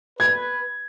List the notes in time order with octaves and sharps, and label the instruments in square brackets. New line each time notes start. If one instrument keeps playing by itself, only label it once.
[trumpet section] B4 [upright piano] G#6